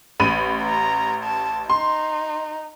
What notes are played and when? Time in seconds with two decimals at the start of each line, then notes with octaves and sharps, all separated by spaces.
0.20 A1 B5 D#7
0.63 A#5
1.23 A5
1.70 D#4 C6